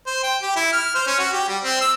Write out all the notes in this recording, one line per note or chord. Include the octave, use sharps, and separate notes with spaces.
C5
G5
G4
E4
F6
C5
C#4
F#4
G4
G3
C4
E6